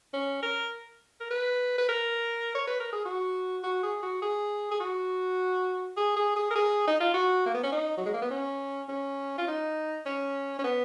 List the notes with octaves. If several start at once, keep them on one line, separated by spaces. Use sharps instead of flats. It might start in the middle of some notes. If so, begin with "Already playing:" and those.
C#4
A#4
A#4
B4
B4
A#4
C#5
B4
A#4
G#4
F#4
F#4
G#4
F#4
G#4
G#4
F#4
G#4
G#4
G#4
A#4
G#4
D#4
F4
F#4
A#3
B3
C#4
D#4
F#3
G#3
A#3
B3
C#4
C#4
F4
D#4
C#4
C#4
B3